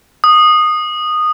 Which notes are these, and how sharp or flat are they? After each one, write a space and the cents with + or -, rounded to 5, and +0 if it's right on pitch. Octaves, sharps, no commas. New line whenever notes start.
D#6 -15